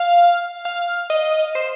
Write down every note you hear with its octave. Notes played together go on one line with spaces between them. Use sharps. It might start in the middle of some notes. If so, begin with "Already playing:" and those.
Already playing: F5
F5
D#5
C5